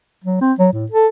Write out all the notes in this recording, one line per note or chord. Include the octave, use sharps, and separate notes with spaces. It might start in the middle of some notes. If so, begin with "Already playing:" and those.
F#3
C4
F#3
A2
A4